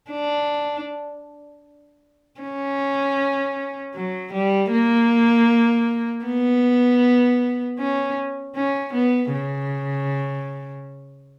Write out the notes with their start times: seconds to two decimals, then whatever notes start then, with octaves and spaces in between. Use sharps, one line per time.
0.11 D4
2.41 C#4
3.94 F#3
4.33 G3
4.72 A#3
6.25 B3
7.79 C#4
8.55 C#4
8.94 B3
9.33 C#3